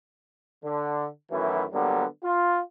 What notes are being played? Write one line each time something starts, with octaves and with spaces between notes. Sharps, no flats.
D3
F#2 D#3 E3 F#3 A3 E4
D3 F#3 G3 A#3 B3
F4